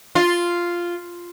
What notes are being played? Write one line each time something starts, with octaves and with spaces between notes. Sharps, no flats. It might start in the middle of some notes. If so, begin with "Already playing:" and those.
F4